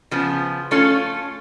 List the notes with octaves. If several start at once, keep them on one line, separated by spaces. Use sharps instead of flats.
C#3 F3 B3
A3 C#4 F4 A4